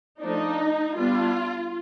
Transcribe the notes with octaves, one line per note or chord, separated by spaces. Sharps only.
F3 A3 D4 D#4
G3 B3 D4 F4